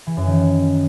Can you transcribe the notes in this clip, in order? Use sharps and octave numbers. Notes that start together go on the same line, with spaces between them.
E3
F#2
D#3